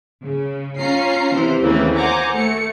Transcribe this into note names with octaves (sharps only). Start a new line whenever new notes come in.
C#3
C#4 F4 A#5 C7
C3 E3 C5
D#2 C#3 E3 A3 A#3 C4
C5 F#5 G#5 A#5 D6
A3 C#7